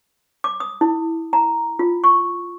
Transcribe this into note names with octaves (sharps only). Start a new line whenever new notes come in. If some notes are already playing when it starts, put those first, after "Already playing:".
D6
D#6
E4
A#5
F4
C#6